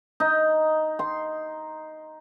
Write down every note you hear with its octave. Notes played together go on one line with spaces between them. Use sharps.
D#4
C6